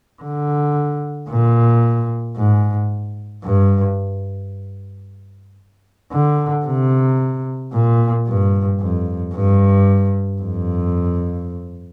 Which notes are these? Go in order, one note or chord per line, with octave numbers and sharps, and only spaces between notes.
D3
A#2
G#2
G2
D3
C3
A#2
G2
F2
G2
F2